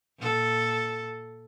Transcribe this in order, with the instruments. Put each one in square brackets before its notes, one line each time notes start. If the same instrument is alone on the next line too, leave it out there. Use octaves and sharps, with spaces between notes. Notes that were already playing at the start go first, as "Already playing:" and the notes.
[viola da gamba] A#2 A4